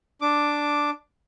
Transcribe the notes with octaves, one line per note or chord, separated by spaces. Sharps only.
D4 D6